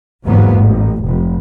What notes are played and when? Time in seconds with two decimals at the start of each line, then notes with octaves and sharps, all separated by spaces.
0.25 G1 E2 G#2 F#3 A#3 B3
0.56 A1
1.02 F1